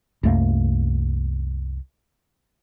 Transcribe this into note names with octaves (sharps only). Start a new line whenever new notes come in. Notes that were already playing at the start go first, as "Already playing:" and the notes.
C2 F#2 A3 A#3